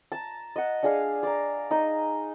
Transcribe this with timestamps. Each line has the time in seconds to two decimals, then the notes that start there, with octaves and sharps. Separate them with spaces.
0.12 A5 A#5
0.56 D#5 F#5
0.83 D4 G#4 F5
1.23 D5 A#5
1.71 D#4 D#5